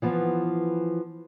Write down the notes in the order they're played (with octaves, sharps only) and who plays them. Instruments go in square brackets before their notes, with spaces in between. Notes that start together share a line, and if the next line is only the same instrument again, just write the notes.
[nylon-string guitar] E3 F3 B3